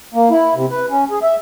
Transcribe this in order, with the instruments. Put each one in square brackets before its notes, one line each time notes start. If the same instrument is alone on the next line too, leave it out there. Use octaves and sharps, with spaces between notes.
[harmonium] A#3
E4
C3
B4
C#4
G#4
E5